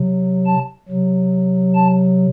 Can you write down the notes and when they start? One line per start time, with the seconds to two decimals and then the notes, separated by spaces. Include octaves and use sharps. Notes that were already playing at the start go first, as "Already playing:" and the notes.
Already playing: C3 F#3
0.47 A5
0.89 C3 F#3
1.75 A5